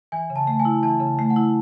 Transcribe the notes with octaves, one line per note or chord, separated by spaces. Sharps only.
E3 G#5
C#3
A5
A3
G#5
E4
E3 A5
C#3
A3
F#5
E4